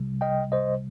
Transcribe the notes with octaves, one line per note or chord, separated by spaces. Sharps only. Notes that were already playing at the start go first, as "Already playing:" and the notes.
Already playing: C2 C3 G3
D#5 G5
C5 D#5